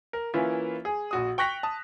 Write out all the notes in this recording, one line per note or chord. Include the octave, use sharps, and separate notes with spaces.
A#4
E3 A#3 C#4 E4 F4
G#4
A#1 F#4 D#6
G5 C#6 F#6 A#6 B6 F7
A5 D#6